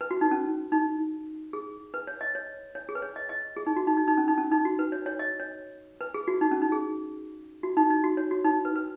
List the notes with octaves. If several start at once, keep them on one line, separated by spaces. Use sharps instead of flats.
B4
F#4
D#4
C#4
D#4
G#4
B4
C#5
D#5
C#5
C#5
G#4
B4
C#5
D#5
D#5
G#4
D#4
F#4
D#4
D#4
D#4
C#4
D#4
C#4
D#4
F#4
B4
C#5
C#5
D#5
C#5
B4
G#4
F#4
D#4
C#4
D#4
G#4
F#4
D#4
D#4
F#4
C#5
F#4
D#4
B4
B4